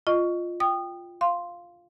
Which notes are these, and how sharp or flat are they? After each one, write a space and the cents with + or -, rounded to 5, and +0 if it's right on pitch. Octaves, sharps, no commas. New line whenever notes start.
F4 +0 D#5 -15 C#6 +15
G5 +5 D#6 -25
F5 +0 C6 +0